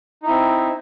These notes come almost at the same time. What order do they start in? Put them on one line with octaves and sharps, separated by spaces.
D#4 E4 C4